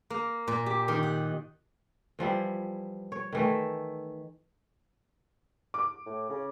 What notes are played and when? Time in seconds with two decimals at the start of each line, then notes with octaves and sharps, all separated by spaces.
0.10 A#3
0.48 A#2
0.66 G4
0.88 D#3
1.03 F#5
2.19 E3 F3 G3 E4
3.12 C#5
3.33 D#3 E3 A3
5.74 D6
6.06 A2
6.30 C#3